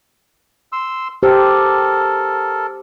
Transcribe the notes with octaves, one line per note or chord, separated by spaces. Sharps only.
C6 E6
G4 A4 A#4 C5